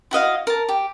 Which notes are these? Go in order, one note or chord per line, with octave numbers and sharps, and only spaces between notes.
E4 F#4 D#5 F5
A#4 A5
G4